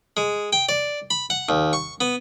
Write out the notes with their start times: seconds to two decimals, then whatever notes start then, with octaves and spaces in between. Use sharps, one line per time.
0.17 G#3
0.53 G5
0.69 D5
1.10 B5
1.30 F#5
1.49 D#2
1.73 C#6
2.01 B3